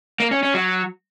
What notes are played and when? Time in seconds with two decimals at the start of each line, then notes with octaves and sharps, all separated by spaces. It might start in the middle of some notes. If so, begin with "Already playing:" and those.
0.20 A#3
0.31 C#4
0.43 C#4
0.54 F#3